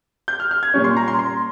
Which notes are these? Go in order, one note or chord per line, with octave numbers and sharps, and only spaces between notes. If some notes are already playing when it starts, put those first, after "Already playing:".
G6
F6
F6
G#6
A#2 G3 C#4
C6
A#5
C6
C6